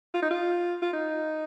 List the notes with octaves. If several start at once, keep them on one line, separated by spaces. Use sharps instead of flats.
F4
D#4
F4
F4
D#4